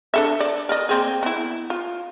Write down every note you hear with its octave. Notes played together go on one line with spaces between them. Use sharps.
D4 A4 E5
D5
A#4 D5 D#5
A#3 C4 G#4
B3 E4
F4